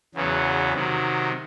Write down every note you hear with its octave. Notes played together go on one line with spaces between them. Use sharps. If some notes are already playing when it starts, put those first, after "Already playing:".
E2 C#3 F#3 B3
C3 D#3 F#3